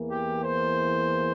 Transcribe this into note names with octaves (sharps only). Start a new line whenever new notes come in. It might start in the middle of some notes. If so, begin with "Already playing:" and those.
Already playing: E2 E3 A#3
G4
C5